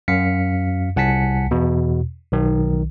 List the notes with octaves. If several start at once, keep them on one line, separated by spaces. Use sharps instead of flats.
F#2 F5 B6 C#7
C2 F#5 G#5 A5 B6 C#7
E2 B2
B1 D#3